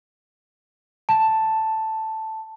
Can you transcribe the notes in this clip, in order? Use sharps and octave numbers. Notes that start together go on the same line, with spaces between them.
A5